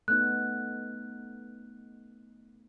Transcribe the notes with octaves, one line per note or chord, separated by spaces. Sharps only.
A3 B3 D#4 F#6